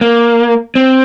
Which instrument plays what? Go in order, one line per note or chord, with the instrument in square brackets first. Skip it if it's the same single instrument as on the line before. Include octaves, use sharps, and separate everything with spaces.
[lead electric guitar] A#3
C4